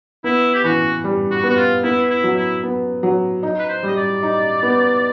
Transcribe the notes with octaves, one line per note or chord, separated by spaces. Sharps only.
B3 E4
G4
E3 F#4
G3
F#4
B3
F#4
F4
B3 E4
E4
F#3
E4
B3
F#3
D#4
B4
C5
G3 D#5
D5
D#4
B3